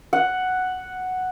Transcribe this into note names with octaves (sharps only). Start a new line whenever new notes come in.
F#5